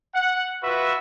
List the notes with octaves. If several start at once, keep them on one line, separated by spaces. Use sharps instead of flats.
F#5
F4 F#4 B4 E5